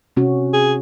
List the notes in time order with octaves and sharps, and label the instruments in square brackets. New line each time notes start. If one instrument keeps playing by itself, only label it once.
[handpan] C3 C#4 F#4
[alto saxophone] G#4